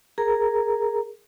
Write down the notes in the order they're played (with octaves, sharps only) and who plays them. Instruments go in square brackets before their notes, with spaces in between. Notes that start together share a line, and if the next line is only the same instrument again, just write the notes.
[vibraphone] G#4 A#4 A#5